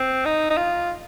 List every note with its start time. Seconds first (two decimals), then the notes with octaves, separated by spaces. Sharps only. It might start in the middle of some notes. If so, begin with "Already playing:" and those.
Already playing: C4
0.25 D#4
0.50 D#4
0.57 F4